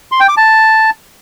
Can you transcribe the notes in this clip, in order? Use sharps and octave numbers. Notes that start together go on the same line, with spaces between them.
C6
G5
D6
A5